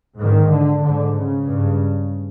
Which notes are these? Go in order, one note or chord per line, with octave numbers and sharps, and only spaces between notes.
G#2 D#3
D3
G#2 D3
C#3
G2